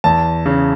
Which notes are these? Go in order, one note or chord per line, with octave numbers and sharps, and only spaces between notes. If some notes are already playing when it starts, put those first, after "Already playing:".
E2 A5
C#3